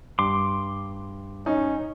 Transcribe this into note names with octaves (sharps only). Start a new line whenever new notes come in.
G2 C6 D6
C#4 D#4